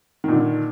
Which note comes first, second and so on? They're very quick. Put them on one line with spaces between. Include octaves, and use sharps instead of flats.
D#3 A#2 D3